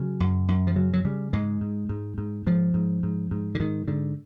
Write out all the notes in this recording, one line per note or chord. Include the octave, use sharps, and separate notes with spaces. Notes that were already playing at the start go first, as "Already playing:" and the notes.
Already playing: C#3 F#3
F#2
F#2
F3
C#3 F#3
F#3
C#3 G3
G#2 G#3
G#2
G#2
G#2
G#2 F3
G#2
G#2
G#2
D3
G#2 D#3
G#2 D3